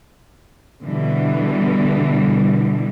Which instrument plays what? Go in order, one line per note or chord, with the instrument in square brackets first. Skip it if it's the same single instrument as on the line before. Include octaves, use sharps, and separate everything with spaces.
[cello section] B2 D3 E3 G3